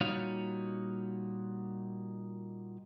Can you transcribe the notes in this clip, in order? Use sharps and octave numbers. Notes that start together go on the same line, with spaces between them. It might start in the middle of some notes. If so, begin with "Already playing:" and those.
A#2 G3 D#4 F#4 C#5 F5